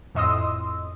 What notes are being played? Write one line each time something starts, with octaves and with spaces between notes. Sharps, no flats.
F2 A2 D#5 C6 D#6 E6